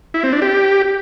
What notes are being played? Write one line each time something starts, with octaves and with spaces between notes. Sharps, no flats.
E4
C4
D4
G4